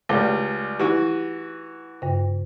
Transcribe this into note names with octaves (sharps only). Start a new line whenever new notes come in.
C#2 G3 A3 A4
E3 D#4 F#4 G4
G2 C#3